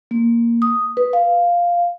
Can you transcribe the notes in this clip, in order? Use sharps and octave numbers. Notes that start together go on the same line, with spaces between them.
A#3
D#6
B4
F5